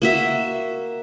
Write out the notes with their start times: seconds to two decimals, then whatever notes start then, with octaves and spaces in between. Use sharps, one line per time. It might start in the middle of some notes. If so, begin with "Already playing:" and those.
0.02 A#3 F#4 E5